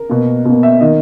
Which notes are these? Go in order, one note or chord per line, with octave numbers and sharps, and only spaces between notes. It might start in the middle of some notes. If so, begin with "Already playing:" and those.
Already playing: A#4
B2 A#3
B2 A#3
E5
D#3 A#3 D#5